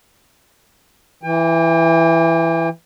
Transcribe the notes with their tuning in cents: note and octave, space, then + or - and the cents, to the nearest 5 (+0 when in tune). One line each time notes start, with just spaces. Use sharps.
E3 +10 G5 +40